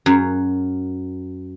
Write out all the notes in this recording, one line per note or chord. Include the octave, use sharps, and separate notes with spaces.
F#2